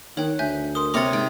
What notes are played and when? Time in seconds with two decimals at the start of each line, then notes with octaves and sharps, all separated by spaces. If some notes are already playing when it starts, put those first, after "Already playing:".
0.17 D#3 C#5 F#5 G5
0.39 D2 E5 G#5 G6
0.75 A#4 C6 D#6
0.94 C3 C#5 A#5 C6 D6 F6 A6 C#7
1.13 G#2 G5